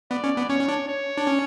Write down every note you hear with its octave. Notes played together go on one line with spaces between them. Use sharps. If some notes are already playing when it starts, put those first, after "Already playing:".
B3 D5
C#4
B3
C#4 C#5
C#4
D4
C#5
D4
C#4